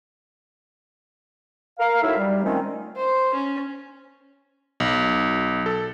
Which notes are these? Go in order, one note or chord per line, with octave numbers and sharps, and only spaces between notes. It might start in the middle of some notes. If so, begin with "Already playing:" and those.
A#4 F5
F#3 A3 D#4 E4 E5
G3
D#3 F3 G#3 A3 C4 C#4
C5
C#4
B1
A4